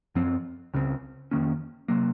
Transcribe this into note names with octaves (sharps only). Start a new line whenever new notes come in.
F#2 F3 C4
C#2 C#3 F3 C4
F2 D#3 A#3 C#4
C3 F#3 A#3